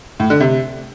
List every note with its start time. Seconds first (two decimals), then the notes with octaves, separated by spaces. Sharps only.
0.20 A2
0.30 D3
0.40 C3